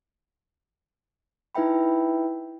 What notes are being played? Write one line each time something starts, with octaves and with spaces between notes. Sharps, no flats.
D#4 E4 B4 E5 G5 B5